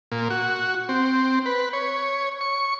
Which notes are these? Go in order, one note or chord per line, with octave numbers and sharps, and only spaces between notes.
A#2
F#4
C4
B4
C#5
C#6